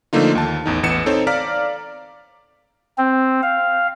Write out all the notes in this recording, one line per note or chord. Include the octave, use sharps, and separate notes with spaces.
D3 F3 A3 A#3 D#4 F4
D#2 A5
A1 E2 D#4
A1 E2 B3 C#7 E7
C4 D#4 A4 C5 C#5
D5 F5 A#5 D6 F6 B6
C4
F5